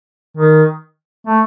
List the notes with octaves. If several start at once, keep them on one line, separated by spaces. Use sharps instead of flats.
D#3
A3